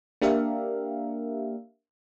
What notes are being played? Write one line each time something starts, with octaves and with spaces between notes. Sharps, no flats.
A#3 D4 G4 A#4 E5 F5